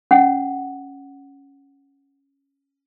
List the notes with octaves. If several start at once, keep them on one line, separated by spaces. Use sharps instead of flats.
C#4 F#5